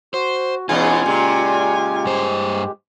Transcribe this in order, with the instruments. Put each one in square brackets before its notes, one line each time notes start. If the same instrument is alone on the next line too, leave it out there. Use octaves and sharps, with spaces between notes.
[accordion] F#4 [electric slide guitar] C5
[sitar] E2 B2 G#3 [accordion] C#4 D#4 [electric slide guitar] F4 [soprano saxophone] G#5
[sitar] A#2 C#3 [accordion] G#3 G4
[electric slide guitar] G2 C5